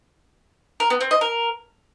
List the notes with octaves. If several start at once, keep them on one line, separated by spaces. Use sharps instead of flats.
A#4
B3
C4
D#5
A#4